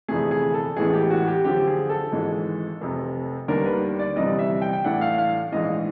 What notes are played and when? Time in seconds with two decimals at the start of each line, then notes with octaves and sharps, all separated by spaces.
0.08 G1 F2 C3 E3 A3 G#4
0.31 G#4
0.54 A4
0.77 A1 A2 E3 G#3 B3 G#4
0.93 G4
1.10 F#4
1.28 G4
1.44 F#2 D3 F3 G4
1.67 G#4
1.90 A4
2.12 G#1 G#2 E3 G#3
2.81 F1 F2 C3
3.48 D#2 D#3 G3 B3 D4 A#4
3.66 B4
3.99 D5
4.16 G1 F2 C3 E3 G3 D#5
4.39 E5
4.62 G5
4.73 G5
4.84 A2 E3 A3 D4 F#5
5.01 F5
5.18 F5
5.52 A#1 G#2 E3 D#5